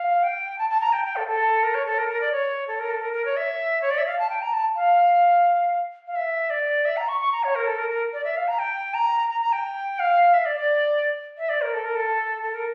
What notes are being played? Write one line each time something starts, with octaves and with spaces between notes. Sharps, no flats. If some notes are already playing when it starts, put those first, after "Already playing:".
Already playing: F5
G5
A5
A5
A#5
G5
G5
A4
A4
A#4
C#5
A4
A#4
A#4
D5
C#5
A4
A#4
A4
A#4
A#4
C#5
E5
C#5
D5
E5
F5
A5
G5
A#5
A5
F5
F5
E5
D5
E5
A#5
C#6
C#6
A#5
C#5
A#4
A4
A#4
A#4
D5
E5
F5
A#5
G5
A#5
A#5
A#5
G5
F5
E5
D5
D5
E5
D5
A#4
A4
A#4
A4
A4
A#4